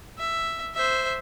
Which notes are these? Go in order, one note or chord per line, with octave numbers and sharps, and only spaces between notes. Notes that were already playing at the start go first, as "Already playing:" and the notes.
E5
C5 E5